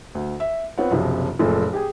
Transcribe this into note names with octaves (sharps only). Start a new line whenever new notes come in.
D2
E5
B3 C4 F4 C#5 F#5
F#1 B1 C3 F3
F#1 A#2 F3 A3 A4
G4 G#4